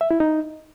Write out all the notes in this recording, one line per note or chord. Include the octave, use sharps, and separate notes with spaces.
E5
E4
D#4